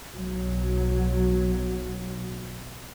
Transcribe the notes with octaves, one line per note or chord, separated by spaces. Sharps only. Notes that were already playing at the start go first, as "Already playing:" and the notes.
B1 F#3